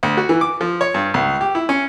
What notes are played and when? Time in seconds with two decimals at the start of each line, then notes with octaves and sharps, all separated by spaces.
0.03 D2
0.17 F#4
0.29 E3
0.41 D6
0.61 F3
0.81 C#5
0.94 G2
1.14 C#2
1.41 G4
1.55 E4
1.69 C#4